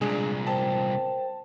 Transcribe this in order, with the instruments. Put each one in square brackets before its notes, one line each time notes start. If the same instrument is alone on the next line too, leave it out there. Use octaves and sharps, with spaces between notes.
[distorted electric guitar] C2 A#2 [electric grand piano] G#3 D4 G#4
[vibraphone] A#4 C5 G5 [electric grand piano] A5